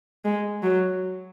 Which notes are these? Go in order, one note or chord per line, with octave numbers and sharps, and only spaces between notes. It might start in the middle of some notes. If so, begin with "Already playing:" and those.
G#3
F#3